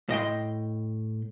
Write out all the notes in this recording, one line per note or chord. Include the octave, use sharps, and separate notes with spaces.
A2 D#5 G5 C6